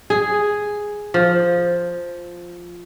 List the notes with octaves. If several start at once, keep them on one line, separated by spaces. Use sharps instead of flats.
G#4
F3